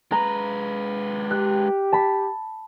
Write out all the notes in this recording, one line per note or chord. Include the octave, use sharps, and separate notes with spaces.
G#3 B4 A#5
G4 F#6
A5 B5